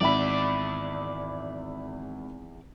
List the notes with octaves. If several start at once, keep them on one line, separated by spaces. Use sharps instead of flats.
G#1 E2 D5 E5 B5